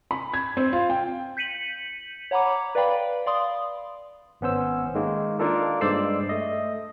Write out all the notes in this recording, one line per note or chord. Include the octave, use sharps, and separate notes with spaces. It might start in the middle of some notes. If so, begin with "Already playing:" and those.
B5
G#6
C4
F4
G5
G6 B6 C#7 D#7 F#7
C#5 F#5 A#5 B5 D6
B4 D5 F5 G5 B5
D5 F5 C6 D#6
G#1 B3 C#4 C5 E6
D#3 G#3 A#3
A#3 D4 D#4 F4 A4 A#4
G2 G#3 C5 D5 E6 C7
A3 D#5